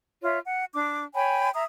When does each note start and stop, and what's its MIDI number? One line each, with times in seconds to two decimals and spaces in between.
0.23 0.38 65
0.23 0.38 73
0.23 0.38 76
0.45 0.65 78
0.74 1.04 62
0.74 1.04 86
1.15 1.51 73
1.15 1.51 79
1.15 1.51 80
1.15 1.51 83
1.54 1.64 76
1.54 1.64 82
1.54 1.64 87